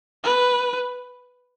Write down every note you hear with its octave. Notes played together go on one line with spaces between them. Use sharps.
B4